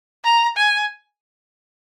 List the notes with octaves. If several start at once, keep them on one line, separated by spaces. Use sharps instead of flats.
A#5
G#5